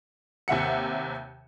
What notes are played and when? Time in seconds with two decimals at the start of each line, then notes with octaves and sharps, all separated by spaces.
0.48 D#2 C3 E5 F#5 C#7